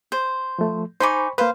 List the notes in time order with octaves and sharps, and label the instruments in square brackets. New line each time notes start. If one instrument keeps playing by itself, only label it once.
[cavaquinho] C5
[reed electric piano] F3 A3
[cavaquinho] D#4 G#5 D6 [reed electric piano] C5 B5 C#6
[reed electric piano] A#3 B4 [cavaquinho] C5 F5